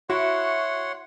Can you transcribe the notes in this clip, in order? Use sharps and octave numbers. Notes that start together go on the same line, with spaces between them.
E4 F#4 C#5 F#5 C6